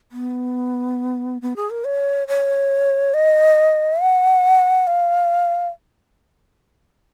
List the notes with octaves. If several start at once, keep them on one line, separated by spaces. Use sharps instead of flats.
B3
B3
G#4
A#4
C#5
C#5
D#5
F#5
F5